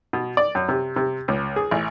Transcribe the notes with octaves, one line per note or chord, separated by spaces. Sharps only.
B2
D5
F#2
C3
C3
C#2
G#4
A1